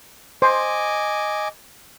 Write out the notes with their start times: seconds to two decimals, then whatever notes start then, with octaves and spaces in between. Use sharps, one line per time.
0.42 C5 D#5 G#5 D6